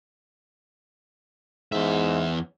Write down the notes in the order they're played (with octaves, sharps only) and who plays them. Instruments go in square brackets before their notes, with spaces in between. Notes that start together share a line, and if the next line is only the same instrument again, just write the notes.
[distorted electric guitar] E2 E5 [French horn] G#2